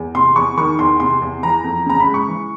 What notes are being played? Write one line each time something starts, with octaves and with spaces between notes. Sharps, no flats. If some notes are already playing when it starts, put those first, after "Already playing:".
Already playing: E2
C3 C6
E2 C#6
D#3 C#6
E2 C6
C3 C6
E2
E3 A#5
F2
C#3 A#5
B5
G#3
C#6
E3